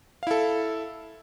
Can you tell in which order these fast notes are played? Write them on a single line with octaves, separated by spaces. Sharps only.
F5 E4 A4